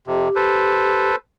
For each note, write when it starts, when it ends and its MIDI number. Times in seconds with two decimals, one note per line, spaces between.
0.07 0.29 41
0.07 0.29 48
0.07 1.10 67
0.36 1.16 69
0.36 1.16 71
0.36 1.16 72